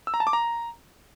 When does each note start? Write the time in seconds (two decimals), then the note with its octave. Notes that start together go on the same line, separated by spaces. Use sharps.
0.07 E6
0.14 A#5
0.20 A5
0.27 D6
0.33 A#5